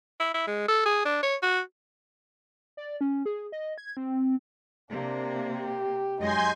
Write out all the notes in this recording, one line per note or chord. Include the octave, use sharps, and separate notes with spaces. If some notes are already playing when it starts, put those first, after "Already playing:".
E4
E4
G#3
A4
G#4
D4
C#5
F#4
D5
C#4
G#4
D#5
G#6
C4
C3 A#3 D4
G4
F#2 G#3 D#4 D#5 G#5 C6 G6